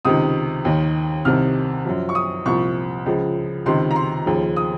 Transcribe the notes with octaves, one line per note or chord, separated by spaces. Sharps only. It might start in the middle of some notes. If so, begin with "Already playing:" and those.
C#2 C3 D#3 D#6
D#2 D#3
C2 C3 D#3 F6
F#2 F3
C#6
D#6
C2 A#2 F3 C#6
C#2 C#3 F3
C#2 C3 D#3 C6
A#5
C6
D#2 C#3 F3
D#6